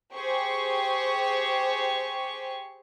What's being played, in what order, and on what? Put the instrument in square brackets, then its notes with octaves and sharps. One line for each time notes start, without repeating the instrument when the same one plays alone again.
[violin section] G4 G#4 C5 C#6